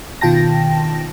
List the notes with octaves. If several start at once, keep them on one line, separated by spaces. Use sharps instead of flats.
B2 D#3 F4 G5 A5 A#6